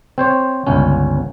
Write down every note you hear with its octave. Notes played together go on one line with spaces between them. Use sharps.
C4 C5 C#5
G1 C#2 C#4